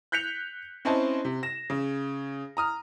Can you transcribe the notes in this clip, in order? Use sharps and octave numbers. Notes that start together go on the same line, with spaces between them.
F#6 G6 B6 C#7 F7
C4 C#4 E4 C5 D#5 A5
C3
A#6 E7
C#3
A#5 D#6 F6